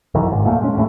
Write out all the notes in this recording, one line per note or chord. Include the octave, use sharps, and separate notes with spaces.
B1 F#2 D#3 E3
D#1 G#1 G#2
F2 A#2 A3 A#3
G#3 C#4
A1 D#2 A2 A3